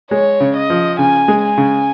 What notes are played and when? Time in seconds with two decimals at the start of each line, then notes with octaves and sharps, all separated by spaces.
0.11 G#3 C#5
0.40 C#3
0.55 D#5
0.70 F3
0.99 C#3 G#5
1.28 G#3
1.43 G#5
1.58 C#3